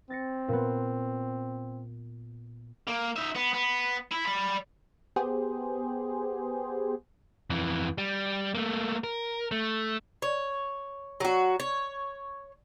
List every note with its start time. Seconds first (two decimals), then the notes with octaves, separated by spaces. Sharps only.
0.10 C4 A6 A#6 C#7
0.48 A#2 B3
2.88 A#3
3.16 D#4 E5
3.35 B3
3.53 B3
4.11 E4
4.26 D5 B5
5.16 B3 G4 G#4 C5
7.50 F2 E3
7.98 G3
8.55 A3 A#3
9.04 A#4
9.51 A3
10.22 C#5
11.20 F#3 F#4
11.60 C#5